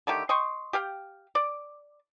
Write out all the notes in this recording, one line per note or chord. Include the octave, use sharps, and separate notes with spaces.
D3 D#3 A3 G4
D#5 G5 C6 C#6
G4 F5 G5
D5